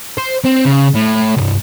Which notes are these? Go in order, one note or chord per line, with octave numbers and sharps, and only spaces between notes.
C5
C4
C#3
A2
C2 G2